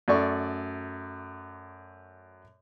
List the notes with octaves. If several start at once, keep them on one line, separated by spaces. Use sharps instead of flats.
F#2 A3 D5 C#6